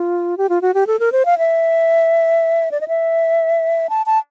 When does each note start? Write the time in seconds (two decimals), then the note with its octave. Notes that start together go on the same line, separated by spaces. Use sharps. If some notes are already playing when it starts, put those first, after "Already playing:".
Already playing: F4
0.38 G4
0.49 F4
0.62 F#4
0.74 G4
0.87 A4
1.00 A#4
1.12 C5
1.26 F5
1.38 E5
2.71 D5
2.81 D#5
2.88 E5
3.89 A5
4.06 A5